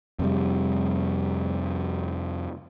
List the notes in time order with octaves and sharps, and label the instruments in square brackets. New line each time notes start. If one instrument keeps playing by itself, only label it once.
[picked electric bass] F2 C3 G3